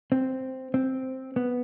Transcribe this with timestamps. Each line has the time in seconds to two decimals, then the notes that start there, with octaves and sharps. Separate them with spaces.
0.12 C4
0.74 C4
1.36 B3